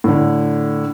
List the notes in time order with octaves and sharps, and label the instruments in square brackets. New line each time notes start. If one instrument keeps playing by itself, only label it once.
[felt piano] A2 D3